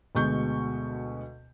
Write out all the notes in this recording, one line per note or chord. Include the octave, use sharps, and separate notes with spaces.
D2 B2 G#3 C#6 G6